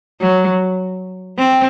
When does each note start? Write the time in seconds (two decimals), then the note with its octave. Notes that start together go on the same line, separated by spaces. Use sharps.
0.21 F#3
1.38 C4